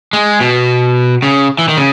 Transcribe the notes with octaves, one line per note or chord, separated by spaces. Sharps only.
G#3
B2
C#3
E3
D#3
C#3